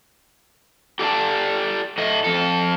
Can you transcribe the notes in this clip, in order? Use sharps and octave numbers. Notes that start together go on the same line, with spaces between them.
G4 A4 D5 A5
A2 A3 D#5
F2 A4